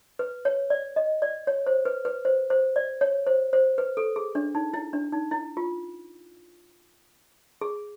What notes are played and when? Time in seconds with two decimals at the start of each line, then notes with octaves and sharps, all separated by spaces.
0.19 B4
0.45 C#5
0.70 D5
0.96 D#5
1.22 D5
1.47 C#5
1.67 C5
1.85 B4
2.05 B4
2.25 C5
2.50 C5
2.76 D5
3.01 C#5
3.27 C5
3.53 C5
3.78 B4
3.97 A4
4.16 G#4
4.35 D4
4.55 D#4
4.74 E4
4.93 D4
5.12 D#4
5.31 E4
5.57 F4
7.61 G#4